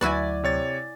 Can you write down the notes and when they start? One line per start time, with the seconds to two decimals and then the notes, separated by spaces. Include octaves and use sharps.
0.01 D2 F#3 E4 F#4 B4 D5 G#5
0.44 C3 C#5 A6